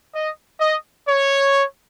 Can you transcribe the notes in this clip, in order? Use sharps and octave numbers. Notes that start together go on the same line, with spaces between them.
D#5
D#5
C#5